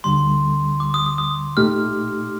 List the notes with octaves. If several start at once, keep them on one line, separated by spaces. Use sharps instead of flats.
D2 D3 G3 C6
D6
D#6
D#6
D#6
A#2 A3 D#4 G4 F6